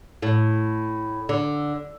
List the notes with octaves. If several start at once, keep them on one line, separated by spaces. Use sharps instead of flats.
A2
D3